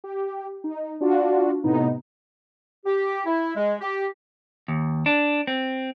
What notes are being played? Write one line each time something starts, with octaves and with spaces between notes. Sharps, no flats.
G4
D#4
D4 F4 F#4
A2 C3 B3 D#4
G4
E4
G#3
G4
D#2
D4
C4